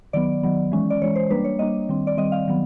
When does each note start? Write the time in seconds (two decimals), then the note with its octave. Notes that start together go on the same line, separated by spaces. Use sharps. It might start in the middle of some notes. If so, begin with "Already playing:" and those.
0.13 D#3 F#3 B3 D5
0.43 D#3 F#3 B3
0.72 E3 G#3 C#4
0.90 D5
1.02 E3 G#3 C#4 C#5
1.16 C5
1.30 G3 A#3 D4 B4
1.44 C#5
1.59 G3 A#3 D4 D#5
1.89 D#3 G3 C4
2.07 D5
2.17 D#3 G3 C4 D#5
2.32 F5
2.48 D#3 F#3 B3